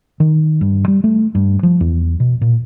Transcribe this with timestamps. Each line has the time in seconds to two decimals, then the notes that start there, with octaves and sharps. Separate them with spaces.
0.20 D#3
0.61 G2
0.88 G3
1.04 A3
1.35 G2
1.63 F3
1.80 E2
2.20 B2
2.41 A#2